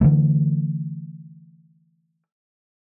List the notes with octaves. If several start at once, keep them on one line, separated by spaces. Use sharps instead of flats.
D3 E3 A3